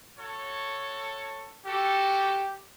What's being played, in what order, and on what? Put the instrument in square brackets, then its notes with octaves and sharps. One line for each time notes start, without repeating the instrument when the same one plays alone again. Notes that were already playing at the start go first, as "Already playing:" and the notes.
[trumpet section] F#4 A4 C#5
[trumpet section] F#4 A4 [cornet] G4